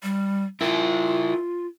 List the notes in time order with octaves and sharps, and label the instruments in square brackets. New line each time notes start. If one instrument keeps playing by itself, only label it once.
[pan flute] G3
[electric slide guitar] E4 A#4 [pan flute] F4